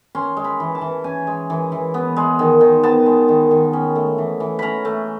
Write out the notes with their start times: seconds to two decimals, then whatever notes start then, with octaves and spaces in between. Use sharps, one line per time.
0.15 C#4 C6
0.37 G#3
0.44 B5
0.60 E3
0.75 A5
0.81 E3
1.04 C#4 G#5
1.27 G#3
1.50 E3
1.72 E3
1.94 B3
2.16 G#3
2.39 D#3
2.61 D#3
2.83 B3 A5
3.06 G#3
3.28 D#3
3.51 D#3
3.73 C#4
3.95 A3
4.18 E3
4.40 E3
4.59 C#4 A#5 B5
4.85 A3